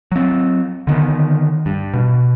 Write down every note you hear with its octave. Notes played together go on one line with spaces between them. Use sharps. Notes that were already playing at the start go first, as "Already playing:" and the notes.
F#3 C4
D3 D#3 B3
G2
B2